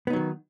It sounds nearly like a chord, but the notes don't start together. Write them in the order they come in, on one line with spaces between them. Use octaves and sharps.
B3 D#4 F#3 D#3